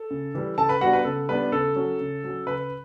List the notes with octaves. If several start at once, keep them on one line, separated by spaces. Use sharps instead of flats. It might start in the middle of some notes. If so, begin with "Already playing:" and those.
Already playing: A4
C#3
E3 G3
C#3 A4 A5
B4 B5
G3 B3 D4 F#4 F#5
B4
C#3 A4
G3 B3 D4 B4
C#3 A4
F#3 C#4
C#3
F#3 C#4
C#3 B4